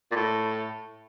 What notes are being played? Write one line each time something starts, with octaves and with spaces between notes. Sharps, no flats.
A#2
A2